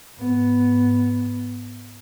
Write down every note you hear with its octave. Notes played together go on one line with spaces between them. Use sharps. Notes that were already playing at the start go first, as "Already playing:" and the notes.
G#2 B3